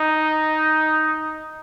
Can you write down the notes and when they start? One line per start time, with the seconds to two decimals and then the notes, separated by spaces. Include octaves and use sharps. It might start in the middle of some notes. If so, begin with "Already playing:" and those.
Already playing: D#4